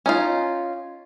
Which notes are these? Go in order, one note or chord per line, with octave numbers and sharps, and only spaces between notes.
C#4 D#4 F4